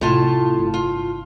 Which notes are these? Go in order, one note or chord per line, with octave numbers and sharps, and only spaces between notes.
A2 C3 F4 A5
G1
F4